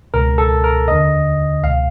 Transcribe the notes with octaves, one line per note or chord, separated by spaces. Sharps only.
C#2 B2 A#4
A4
A#4
D#2 D3 D#5
C#2 B2 F5